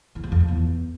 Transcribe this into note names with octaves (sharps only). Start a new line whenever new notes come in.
E3
F3
F2
F#3
E2